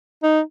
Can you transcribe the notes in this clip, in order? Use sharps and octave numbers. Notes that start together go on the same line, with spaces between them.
D#4